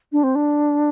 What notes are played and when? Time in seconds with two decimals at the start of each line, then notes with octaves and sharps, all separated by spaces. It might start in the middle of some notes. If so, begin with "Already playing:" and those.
0.12 D4
0.24 C4
0.35 D4